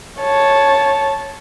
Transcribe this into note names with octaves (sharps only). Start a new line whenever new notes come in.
C#5 A5